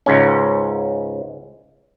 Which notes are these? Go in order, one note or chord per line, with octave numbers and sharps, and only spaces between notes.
C#2 G#2 C#4